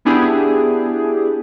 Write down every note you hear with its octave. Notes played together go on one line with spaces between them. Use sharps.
B3 D4 E4 G4 G#4